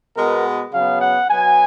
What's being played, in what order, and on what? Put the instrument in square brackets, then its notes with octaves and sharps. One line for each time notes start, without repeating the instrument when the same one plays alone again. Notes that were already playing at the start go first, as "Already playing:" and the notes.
[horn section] B2 G#3 B3 A#4
C#3 F#3 B3 F5
F#5
B2 F#3 B3 G#5